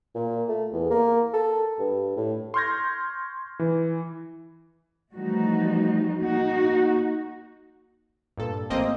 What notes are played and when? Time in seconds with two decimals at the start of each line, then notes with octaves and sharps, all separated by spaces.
0.15 A#2
0.49 A3
0.72 E2
0.90 A#3
1.33 A4
1.79 G2
2.17 A2
2.54 C6 C#6 F6 G6 G#6 A#6
3.59 E3
5.14 E3 F3 G3 A3 D#4 F#4
6.19 A#3 D#4 F#4
8.37 G2 A#2 A4
8.70 A1 A#3 C4 D#5